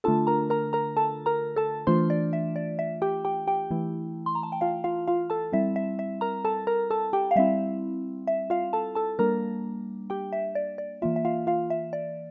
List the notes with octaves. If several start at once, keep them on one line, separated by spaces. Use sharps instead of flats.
D3 A3 D4 F4 A4 A5
A#4 A#5
A#4 A#5
A#4 A#5
A4 A5
A#4 A#5
A4 A5
E3 A3 D4 F4 C5 C6
D5
E5
D5
E5
G4 G5
G4 G5
G4 G5
E3 A3 E4
C6
A#5
A5
G5
F4 F5
F4 F5
F4 F5
A4 A5
G3 C4 E4 E5
E5
E5
A#4 A#5
A4 A5
A#4 A#5
A4 A5
G4 G5
F5
G3 C4 E4 E5
E5
F4 F5
A4 A5
A4 A5
G3 A#3 D4 A#4 A#5
G4 G5
E5
D5
D5
E3 A#3 F4 E5
E5
F4 F5
F4 F5
E5
D5